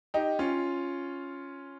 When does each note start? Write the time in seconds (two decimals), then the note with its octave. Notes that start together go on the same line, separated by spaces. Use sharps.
0.14 D#4 G4
0.39 C#4 F4